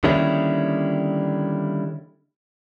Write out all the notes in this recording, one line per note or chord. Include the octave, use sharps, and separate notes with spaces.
D3 D#3 G3 A#3 C#4 E4